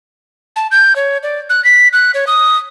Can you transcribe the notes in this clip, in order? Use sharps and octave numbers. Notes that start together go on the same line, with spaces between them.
A5
G6
C#5
D5
F#6
B6
F#6
C#5
D#6